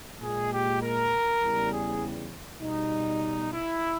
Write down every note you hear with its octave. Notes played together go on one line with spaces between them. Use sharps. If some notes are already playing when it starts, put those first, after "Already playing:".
A#2 G#3 G#4
G4
A#4
E2 C#3 G3
G#4
B2 G3 D#4
E4